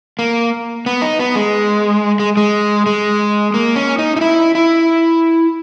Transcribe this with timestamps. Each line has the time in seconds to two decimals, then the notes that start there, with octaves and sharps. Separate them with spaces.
0.19 A#3
0.86 B3
1.02 D#4
1.19 B3
1.36 G#3
2.20 G#3
2.37 G#3
2.86 G#3
3.54 A#3
3.76 C#4
3.98 D#4
4.17 D#4
4.21 E4
4.55 E4